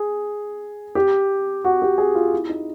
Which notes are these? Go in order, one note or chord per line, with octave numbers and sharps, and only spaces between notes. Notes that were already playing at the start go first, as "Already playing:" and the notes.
Already playing: G#4
G4
F#4
G4
G#4
F4
E4
D#4